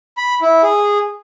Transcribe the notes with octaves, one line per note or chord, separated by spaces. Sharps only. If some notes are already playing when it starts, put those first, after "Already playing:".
B5
E4
G#4